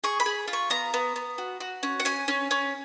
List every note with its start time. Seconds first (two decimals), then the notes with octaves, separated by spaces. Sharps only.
0.04 G#4 C#6
0.20 B5
0.26 G#4
0.48 F4
0.53 C#6
0.70 B3 A#5
0.94 B3
1.16 B3
1.38 F#4
1.60 F#4
1.83 C#4
2.00 F#5
2.05 C#4 G#5
2.28 C#4
2.51 C#4